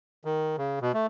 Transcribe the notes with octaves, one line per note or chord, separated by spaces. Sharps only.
D#3
C#3
B2
A3